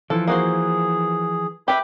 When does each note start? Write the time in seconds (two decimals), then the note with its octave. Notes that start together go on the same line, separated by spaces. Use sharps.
0.10 E3 F3 A4
0.27 A#3 F#4 G#4 C5
1.68 G4 B4 E5 G5 B5